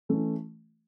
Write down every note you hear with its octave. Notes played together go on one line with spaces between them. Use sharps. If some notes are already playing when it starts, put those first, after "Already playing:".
E3 A3 C#4 E4